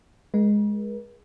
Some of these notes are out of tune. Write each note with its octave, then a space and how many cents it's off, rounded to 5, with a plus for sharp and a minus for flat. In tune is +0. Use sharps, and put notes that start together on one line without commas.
G#3 +0 A#4 +45